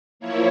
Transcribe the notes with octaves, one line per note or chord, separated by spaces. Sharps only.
F3 A#3 E4 C#5